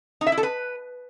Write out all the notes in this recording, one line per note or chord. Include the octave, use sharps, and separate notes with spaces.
D#4
E5
E4
A4
B4